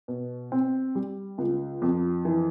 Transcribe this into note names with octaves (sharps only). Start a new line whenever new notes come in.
B2
C4
G3
C#2
F2
E3